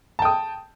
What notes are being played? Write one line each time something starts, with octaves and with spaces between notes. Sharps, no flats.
G5 A5 D#6